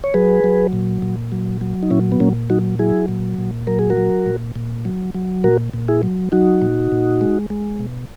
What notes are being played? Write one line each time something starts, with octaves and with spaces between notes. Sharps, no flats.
C#5
F#3 G#4 B4
F#3
A#2
A#2
F#3
F#3
D#4
A#2 C#4 E4
B3
A#2 A#3 C#4
F#3 D#4 F#4
F#3 E4 G#4
A#2
A#2
F#3 A#4
G#4
F#4 A#4
F#3
A#2
A#2
F#3
F#3
A#2 F#4 A#4
A#2
E4 G#4
F#3
F#3 D#4 F#4
A#2
A#2
G#3
G#3
B2